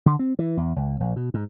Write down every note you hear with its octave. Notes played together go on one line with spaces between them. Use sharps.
D3
C4
E3
E2
C#2
A#1
B2
G#2